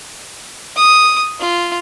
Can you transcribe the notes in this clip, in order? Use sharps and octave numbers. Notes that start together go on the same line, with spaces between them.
D#6
F4